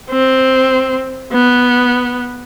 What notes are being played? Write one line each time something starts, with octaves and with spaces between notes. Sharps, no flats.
C4
B3